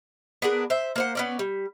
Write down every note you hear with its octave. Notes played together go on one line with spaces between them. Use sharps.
B3 D4 G#4 A#4
C5 E5
A#3 C5 F#5
B3 C#4 D5
G3